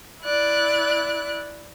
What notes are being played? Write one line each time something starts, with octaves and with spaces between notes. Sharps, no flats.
E4 D5 F#6